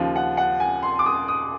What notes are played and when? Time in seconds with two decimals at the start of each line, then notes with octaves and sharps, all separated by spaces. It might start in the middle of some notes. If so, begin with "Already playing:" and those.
Already playing: D#2 C#3 F3
0.16 F#5
0.37 F#5
0.60 G#5
0.83 C6
0.99 D6
1.06 D#6
1.28 D#6